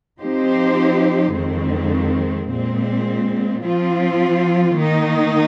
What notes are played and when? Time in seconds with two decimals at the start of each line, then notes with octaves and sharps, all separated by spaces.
0.21 F3 C4 D#4 G4 C5
1.35 F2 D#3 G#3 C4
2.50 A#2 G#3 C4
3.65 F3 C4 F4
4.78 D#3 A#3 D#4